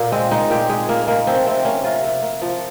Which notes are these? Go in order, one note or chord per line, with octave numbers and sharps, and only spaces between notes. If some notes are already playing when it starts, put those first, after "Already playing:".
Already playing: A#2 A#3
G#3 C4
G#3 D#4
A#2 G4
G#3 G#4
A#2 A#3
G#3 A#3
F3 C4
C3 C4
A#3 C#4
C3 F4
C3
A#3
F3